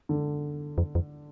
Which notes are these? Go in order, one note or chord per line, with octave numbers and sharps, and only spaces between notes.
D3
F2
F2